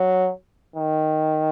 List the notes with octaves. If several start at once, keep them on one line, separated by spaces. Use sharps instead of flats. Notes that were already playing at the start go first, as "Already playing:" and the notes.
Already playing: F#3
D#3